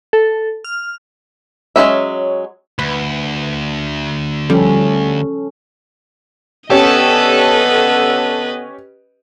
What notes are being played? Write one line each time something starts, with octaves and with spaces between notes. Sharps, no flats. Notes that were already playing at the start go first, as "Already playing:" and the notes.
A4
F6
F#3 G#3 C#4 E5
D2 B4
F3 G3 C#4 A4
D3 B3 C#4 G4 A4 B4 D#5